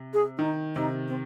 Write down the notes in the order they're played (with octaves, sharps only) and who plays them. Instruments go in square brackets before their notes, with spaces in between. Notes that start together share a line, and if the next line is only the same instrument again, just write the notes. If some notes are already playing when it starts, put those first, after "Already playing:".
Already playing: [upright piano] C3
[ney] G#4
[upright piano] D#3 [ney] D#4
[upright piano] C3 [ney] D#4
[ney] C4